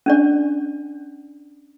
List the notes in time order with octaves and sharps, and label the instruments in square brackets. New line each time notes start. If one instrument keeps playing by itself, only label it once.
[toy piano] C#4 D4 D5